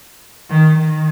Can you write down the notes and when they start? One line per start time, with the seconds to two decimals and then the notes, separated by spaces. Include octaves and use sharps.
0.49 D#3
0.78 D#3